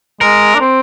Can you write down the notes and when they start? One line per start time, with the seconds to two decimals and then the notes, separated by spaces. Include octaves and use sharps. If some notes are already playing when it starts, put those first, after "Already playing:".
0.21 G#3 A#4
0.55 D4
0.60 C4